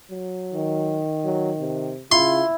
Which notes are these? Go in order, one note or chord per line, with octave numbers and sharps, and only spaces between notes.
F#3
D#3
F#3
C3
C#3 E4 F4 C6